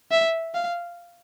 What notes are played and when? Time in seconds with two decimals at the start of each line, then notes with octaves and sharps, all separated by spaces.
0.11 E5
0.54 F5